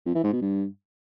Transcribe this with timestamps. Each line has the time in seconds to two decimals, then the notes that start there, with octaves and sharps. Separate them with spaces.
0.06 F2
0.15 E3
0.24 G#2
0.33 B2
0.42 G2